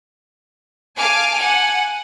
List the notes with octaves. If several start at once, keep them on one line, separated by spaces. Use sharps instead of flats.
F5 G#5 A5 D6 F6
F#5 G#5